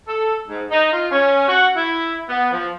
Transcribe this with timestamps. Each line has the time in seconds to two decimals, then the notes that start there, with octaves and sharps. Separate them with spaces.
0.07 A4
0.48 G#2
0.70 D#4
0.92 F4
1.11 C#4
1.48 F#4
1.76 E4
2.29 B3
2.51 F3